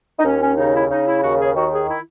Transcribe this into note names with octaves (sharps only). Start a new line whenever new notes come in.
D#4
D#2 C#4
C#4
C#3 D#4
E4
C#3 D#4
E4
D#2 F#4
G#4
D#3 F#4
G#4
E4